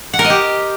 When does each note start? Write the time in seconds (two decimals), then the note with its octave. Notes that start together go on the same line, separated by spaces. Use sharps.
0.13 F#5
0.19 A#4
0.24 D#5
0.30 G4